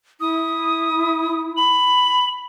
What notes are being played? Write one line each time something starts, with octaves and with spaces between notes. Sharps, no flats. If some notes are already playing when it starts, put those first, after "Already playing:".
E4 D#6
B5 F#7